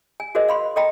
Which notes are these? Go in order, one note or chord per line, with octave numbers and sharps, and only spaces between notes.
G#5
F#4 G#4 A#4 C5 D#5
F5 B5 C6
A4 D#5 G5 A#5 B5